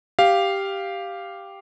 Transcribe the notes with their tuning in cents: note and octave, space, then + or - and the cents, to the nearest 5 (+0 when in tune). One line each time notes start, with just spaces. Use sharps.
G4 +0 F5 -5